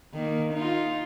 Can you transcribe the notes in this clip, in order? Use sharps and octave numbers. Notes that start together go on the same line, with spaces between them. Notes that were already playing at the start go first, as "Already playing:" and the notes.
D#3 A#3
D#4 F4